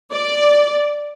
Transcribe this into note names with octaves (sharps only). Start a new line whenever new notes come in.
D5